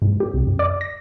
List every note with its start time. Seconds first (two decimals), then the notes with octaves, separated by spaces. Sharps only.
0.02 G#2
0.20 G4
0.34 C2
0.47 F#2
0.59 D5
0.81 A#6